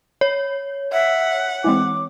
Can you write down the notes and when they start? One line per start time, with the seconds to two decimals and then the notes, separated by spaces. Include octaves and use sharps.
0.21 C#5
0.92 E5 F#5
1.64 E3 G#3 C4 D6